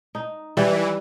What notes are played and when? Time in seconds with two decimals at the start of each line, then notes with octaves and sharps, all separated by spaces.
0.15 D#4
0.57 E3 G3